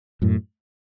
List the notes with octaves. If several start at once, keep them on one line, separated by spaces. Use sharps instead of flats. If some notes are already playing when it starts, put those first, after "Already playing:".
F#2 A2